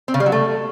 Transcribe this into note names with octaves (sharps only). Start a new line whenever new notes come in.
C4
C#3
G3
F#3
A3